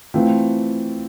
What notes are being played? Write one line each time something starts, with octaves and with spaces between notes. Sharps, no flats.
E3 A3 C4 F4